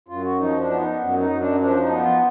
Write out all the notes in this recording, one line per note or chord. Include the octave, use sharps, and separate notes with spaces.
F#2 F4
F#4
F3 D#4
D4
B3
D#4
F#2
D#4
F#2
D4
F3 D4
D#4
B3
F4